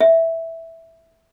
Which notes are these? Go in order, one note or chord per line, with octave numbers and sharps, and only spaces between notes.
E5